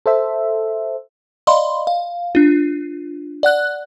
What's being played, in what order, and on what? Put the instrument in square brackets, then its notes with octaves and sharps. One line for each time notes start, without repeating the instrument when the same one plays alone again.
[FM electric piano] A4 C5 E5
[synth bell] D5 D#5 F5 B5 C6
F5
D4 F4
D5 F#5 F#6